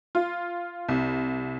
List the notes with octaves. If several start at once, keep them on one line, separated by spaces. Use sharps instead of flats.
F4
C2